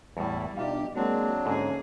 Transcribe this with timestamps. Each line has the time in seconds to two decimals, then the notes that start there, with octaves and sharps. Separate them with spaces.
0.17 E2 A2 G3 E4
0.57 B2 D4 D#4 F4 G4 E5 F5
0.96 F#3 G#3 A#3 C4 D4 F#4
1.46 D2 G#2 A#3 C#4 G#4 A4